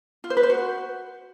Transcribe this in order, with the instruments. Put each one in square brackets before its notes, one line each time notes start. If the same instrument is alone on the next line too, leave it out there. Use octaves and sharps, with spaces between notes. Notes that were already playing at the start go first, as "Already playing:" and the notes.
[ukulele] F4
C5
B4
C5
F#4